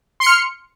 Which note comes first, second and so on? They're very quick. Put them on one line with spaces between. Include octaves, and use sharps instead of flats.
C6 C#7 F6